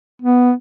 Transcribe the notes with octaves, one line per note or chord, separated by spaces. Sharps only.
B3